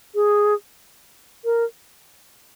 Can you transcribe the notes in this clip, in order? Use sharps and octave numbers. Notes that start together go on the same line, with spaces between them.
G#4
A#4